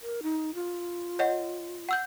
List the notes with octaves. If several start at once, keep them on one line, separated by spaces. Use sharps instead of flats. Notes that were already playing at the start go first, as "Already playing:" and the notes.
A#4
D#4
F4
C#5 D#5 F#5
F#5 E6 G6